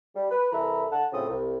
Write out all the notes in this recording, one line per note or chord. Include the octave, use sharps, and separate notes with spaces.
G3
B4
C2 E3 A4 E5 A#5 B5
D3 F#5 A5
A2 C#3 F3 C4 A4 D#6
C2